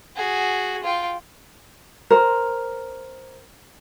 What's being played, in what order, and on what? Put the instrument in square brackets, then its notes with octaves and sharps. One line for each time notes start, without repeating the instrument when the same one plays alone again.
[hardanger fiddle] F#4 G#4
F4 G5
[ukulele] A#4 C5